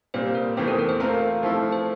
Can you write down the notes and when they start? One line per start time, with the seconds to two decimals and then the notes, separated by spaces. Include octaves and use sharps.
0.14 A#2 G3 C4 C5
0.35 A#4
0.57 E2 E3 A3 C4 G4 C5
0.68 A#4
0.79 A#4
0.89 C5
1.00 A3 C4 F4 A#4 F5
1.43 F3 A3 E4
1.72 C5